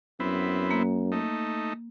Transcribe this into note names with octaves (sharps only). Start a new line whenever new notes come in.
F#2 B3 C4 E4
A#3
A3 D#4